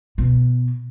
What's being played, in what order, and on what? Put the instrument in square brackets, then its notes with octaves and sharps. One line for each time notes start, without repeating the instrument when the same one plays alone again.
[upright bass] B2